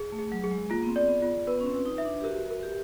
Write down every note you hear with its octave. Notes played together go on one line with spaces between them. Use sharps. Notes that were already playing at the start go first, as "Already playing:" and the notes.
Already playing: G#4
A3
G#4
F#3
G#4
G#3
A#3 F4
B3
C4
D5
B3
F4
B3 B4
C#4
C4
B4
D#4
E5
D4
G4
F#4 A#4
A#4
G4